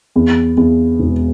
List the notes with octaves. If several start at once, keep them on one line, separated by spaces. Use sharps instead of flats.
E2
E2
E1